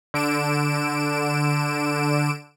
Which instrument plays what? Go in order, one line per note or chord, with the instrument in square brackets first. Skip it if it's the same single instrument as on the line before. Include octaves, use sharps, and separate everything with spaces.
[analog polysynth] D3 D7 E7